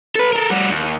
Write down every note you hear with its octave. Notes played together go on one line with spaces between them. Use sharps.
A4 B4
A4 A#4
G3 F#4
D#2